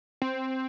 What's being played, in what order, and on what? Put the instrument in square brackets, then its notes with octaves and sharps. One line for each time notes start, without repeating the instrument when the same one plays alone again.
[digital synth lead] C4